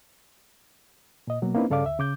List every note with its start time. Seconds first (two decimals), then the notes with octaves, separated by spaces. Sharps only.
1.27 A#2 D#5
1.42 B2 F#3 A#3
1.54 A#3 C4 C#4 D#4 E4 B4
1.70 G2 C#3 A4 D5 F5 D6
1.85 D2 E5
1.99 C#3 D6 G6